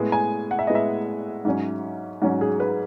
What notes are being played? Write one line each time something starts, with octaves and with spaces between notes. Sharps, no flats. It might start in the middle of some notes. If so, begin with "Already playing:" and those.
Already playing: A2 G#3 B3
G#5
F#5
E5
A2 G#3 B3 D#5
E5
G#2 F#3 C#4
G#2 F#3 C#4 F#4
G#4
B4